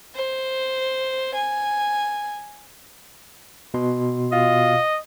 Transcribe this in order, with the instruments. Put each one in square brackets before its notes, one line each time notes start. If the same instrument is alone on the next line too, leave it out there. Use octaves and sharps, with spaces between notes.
[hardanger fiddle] C5
G#5
[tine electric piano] B2 C6
[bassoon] F4 [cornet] D#5